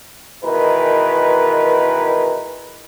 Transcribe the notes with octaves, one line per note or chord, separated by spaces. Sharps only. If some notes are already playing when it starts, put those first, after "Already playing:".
B2 D#3 E3 G#3 A#4 B4